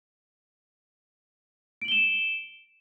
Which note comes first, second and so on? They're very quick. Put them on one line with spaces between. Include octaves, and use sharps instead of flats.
D7 F#7 G7 E7